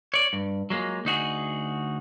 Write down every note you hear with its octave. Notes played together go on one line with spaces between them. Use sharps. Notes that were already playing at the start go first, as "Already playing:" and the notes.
C#5 D5
G2
F#3 G#3 A#3 F4
D2 D#4 F#4 G#4